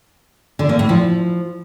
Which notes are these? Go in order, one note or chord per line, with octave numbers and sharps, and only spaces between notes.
D3
A#3
A2
F3